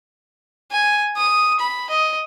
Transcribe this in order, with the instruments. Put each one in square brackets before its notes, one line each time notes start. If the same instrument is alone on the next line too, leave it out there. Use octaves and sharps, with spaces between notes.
[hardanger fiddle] G#5
D#6
B5
D#5